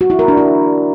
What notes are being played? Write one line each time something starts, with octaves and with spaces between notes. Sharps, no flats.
F#4
E4
A#4
D4
E4